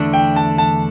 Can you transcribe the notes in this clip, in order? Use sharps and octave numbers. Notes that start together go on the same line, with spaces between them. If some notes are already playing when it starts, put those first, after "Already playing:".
Already playing: E2 D3 A3 D4
G5
A5
A5